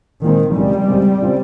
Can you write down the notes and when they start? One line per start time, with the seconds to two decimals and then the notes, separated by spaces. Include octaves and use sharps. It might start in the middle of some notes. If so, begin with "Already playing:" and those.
0.24 A#2 D#3 G#3 C4 D#4
0.55 C#2 C3 D#3 G3 G#3
0.88 C#2 C#3 G#3 C4
1.22 C#3 F3 C4